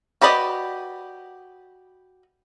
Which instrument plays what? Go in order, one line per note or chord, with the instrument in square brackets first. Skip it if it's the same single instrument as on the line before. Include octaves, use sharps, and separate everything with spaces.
[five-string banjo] F#4 G4 B4 D5 D#5